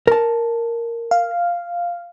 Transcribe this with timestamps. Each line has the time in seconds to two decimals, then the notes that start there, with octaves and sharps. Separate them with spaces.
0.07 A#4 A5
1.11 F5